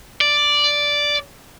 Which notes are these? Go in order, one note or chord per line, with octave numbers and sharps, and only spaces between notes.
D5